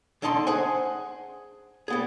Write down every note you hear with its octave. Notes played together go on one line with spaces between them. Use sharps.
E2 D3 D#4 A5 C6
G#4 C5 F#5 G#5
G3 B3 G#4